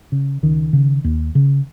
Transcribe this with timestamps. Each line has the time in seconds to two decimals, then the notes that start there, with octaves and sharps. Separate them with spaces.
0.12 C#3
0.43 C#2 D#3
0.73 C#3
1.04 D#2
1.35 C#3